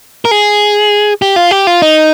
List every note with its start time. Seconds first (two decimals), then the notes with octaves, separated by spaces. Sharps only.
0.25 A#4
0.31 G#4
1.22 G4
1.36 F4
1.51 G4
1.67 F4
1.82 D#4